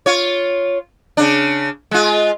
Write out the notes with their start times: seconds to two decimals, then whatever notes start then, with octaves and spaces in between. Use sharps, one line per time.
0.06 F4 C#5
1.17 C#3 D4
1.91 G#3 F4